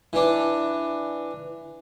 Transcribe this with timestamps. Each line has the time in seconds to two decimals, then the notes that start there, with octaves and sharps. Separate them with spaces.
0.13 E3 D4